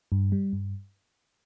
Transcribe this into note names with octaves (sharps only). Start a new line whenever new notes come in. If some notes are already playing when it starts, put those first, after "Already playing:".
G2
G3
G2